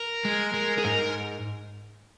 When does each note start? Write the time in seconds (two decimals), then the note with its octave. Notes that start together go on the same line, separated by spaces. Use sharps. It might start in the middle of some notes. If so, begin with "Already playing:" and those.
Already playing: A#4
0.25 G#3
0.54 G#3
0.78 G#4
0.84 G#2 A#4